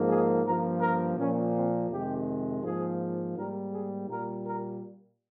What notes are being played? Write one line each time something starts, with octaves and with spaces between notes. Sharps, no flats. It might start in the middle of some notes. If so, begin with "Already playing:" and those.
Already playing: G#2 F3 A#3
G#4
G2 F3 A#3 A#4
A#4
A#2 F3 A#3 C#4
C4
F2 C3 D#3 G#3 G4
G#2 F3 A#3 G#4
G#2 G3 A#3 A#4
G#4
A#2 G3 A#3 A#4
A#4